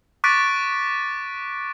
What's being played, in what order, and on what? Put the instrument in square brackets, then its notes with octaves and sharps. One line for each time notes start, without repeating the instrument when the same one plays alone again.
[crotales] C#6 D6 F#6 A6 B6 D7